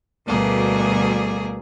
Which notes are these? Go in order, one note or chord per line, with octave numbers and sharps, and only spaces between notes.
D2 B2 G3 A3 A#3 G#4